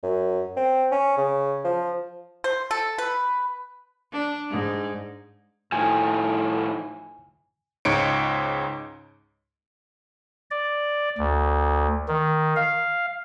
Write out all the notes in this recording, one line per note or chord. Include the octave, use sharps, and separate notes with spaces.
F#2
C4
C#4
C#3
F3
C5
A4
B4
D4
G#2
A2 D#3 F3 G#5
C#2 G#2 D#4 C#5 C#7 D7
D5
D2
D#3
F5